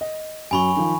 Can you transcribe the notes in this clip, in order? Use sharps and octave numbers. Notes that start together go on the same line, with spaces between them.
D#5
F#2 F#3 G#5 B5 C#6
D#3 F3